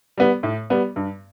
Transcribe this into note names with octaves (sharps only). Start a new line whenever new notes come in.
G3 B3
A2
G3 B3
G2